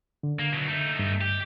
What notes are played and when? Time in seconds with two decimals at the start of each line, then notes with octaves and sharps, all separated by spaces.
0.23 D3
0.39 A#3
0.53 B2 F#3
0.68 A3 D#4
0.99 G2
1.21 G4